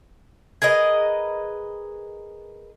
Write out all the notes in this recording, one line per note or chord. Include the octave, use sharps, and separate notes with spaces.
G#4 A#4 B4 D#5